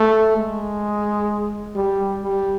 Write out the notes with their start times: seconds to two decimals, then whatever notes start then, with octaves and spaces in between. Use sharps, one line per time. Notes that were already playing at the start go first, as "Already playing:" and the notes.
Already playing: A3
0.37 G#3
1.75 G3
2.22 G3